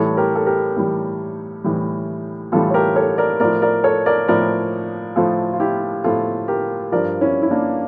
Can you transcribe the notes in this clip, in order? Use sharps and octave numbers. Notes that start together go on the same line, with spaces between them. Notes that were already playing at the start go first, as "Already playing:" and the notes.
Already playing: A2 E3 G3 A4 C#5
G4 A#4
A4
G4 A#4
A2 E3 G3
A2 E3 G3
A2 E3 G3 F4 A4
C#5
G4 A#4
A4 C#5
A#4 D5
A2 F3 A#4 D5
A#4 D5
A4 C#5
A#4 D5
A2 F3 A#4 D5
A2 F3 F4 A4
F4
E4 G4
A2 F3 F4 A4
G4 A#4
G2 F3 A#4 D5
C#4 E4
E4
A#3 D4